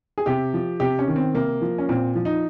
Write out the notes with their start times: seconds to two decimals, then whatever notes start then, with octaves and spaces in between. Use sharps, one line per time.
0.18 G#4
0.26 C3 G4
0.54 F3
0.80 C3 G4
0.99 C#4
1.08 D#3
1.16 C4
1.34 C3 A#3
1.61 F3
1.78 C#4
1.89 A#2 C4
2.15 F3
2.25 D#4